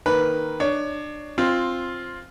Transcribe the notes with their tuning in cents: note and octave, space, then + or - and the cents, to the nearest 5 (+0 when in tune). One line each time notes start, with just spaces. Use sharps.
D#3 +0 A#3 +0 B4 +0
D4 +25 C#5 +25
C4 +10 F4 +0